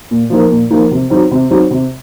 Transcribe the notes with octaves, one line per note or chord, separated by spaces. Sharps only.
A#2
F3 A#3 D#4 A#4
A#2
F3 A#3 D#4 A#4
C3
F#3 C4 D#4
C3
F#3 C4 D#4
C3